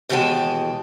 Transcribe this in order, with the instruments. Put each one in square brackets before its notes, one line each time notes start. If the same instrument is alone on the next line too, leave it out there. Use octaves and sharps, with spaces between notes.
[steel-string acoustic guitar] D#2 B2 E3 G#3 G5 A5